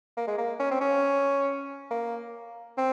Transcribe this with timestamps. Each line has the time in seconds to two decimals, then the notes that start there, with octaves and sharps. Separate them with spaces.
0.17 A#3
0.27 G#3
0.38 A#3
0.60 C#4
0.71 C4
0.81 C#4
1.91 A#3
2.78 C4